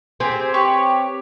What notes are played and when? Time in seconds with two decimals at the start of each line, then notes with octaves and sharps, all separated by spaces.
0.20 C4 G4 G#4
0.54 G4 B4 C#5